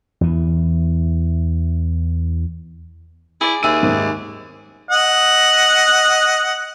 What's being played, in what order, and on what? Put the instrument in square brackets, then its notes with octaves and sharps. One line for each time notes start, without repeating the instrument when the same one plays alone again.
[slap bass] E2 E3
[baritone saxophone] E4 [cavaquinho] G#4 D5
[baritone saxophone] D#2 [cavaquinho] G#4 E5 [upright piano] D#7
[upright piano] G#2 D#3
[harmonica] D#5 F#5